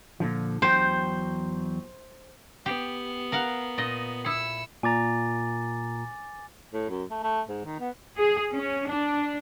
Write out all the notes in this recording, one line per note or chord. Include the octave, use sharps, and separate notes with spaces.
A#2 D3 F3
E2 F#3 C5 G5
B3 G4
A#4 F5 F#5
A#2 D#5
E4 E6 C#7
A#2 G#5 A#5 D6 A6
A2
F#2
A3
A3
G#2
D#3
B3
G#4
C#4
D4